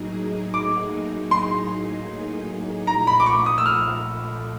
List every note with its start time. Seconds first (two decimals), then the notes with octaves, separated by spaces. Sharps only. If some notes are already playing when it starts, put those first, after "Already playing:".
Already playing: A2 F#3 A#3 D#4 G#4
0.54 D6
1.31 C6
2.87 A#2 F3 A3 A#5
3.07 B5
3.20 D6
3.26 C#6
3.46 D#6
3.58 E6
3.66 F6